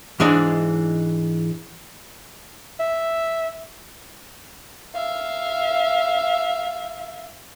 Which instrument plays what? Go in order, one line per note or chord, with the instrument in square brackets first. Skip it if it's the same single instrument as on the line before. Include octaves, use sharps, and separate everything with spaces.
[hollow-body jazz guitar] G#2 E3 G#3 D4
[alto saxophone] E5
[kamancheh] E5 F5